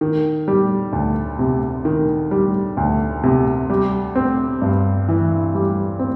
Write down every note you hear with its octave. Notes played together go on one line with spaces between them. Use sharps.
D#3
G3
D2
C3
D#3
G3
D2
C3
G3
C4
G2
E3
G3
C4